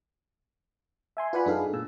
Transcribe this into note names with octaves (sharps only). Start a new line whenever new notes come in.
E5 G#5 C6
F4 B4 D5 F#5 G#5 B5
F#2 D4 D#4 G#4 A4 F5
A#2 E6